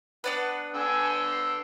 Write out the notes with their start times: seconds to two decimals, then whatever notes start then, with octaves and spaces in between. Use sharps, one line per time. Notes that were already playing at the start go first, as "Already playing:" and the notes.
0.24 B3 D4 B4 F#5
0.75 D3 G5 G#5 E6
1.32 C7